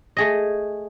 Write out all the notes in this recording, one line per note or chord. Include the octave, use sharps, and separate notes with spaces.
A3 G#4 D#5